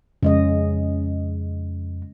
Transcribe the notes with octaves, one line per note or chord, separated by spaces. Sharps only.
F2 C#3 G#3 D#5